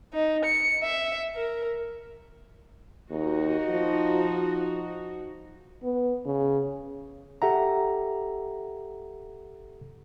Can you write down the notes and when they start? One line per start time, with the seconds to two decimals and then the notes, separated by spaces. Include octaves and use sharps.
0.14 D#4
0.45 C#7
0.83 E5
1.35 A#4
3.10 D#2 D#4 F#4
3.70 F3
5.83 B3
6.26 C#3
7.42 G4 A4 E5 F#5 A#5